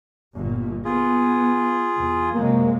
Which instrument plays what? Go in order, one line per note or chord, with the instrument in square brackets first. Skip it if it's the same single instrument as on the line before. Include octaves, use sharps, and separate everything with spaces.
[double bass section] G1 A#2
[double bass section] B3 [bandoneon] F4 G#4
[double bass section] E2
[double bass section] F#2 C3 G#3 [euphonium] A#3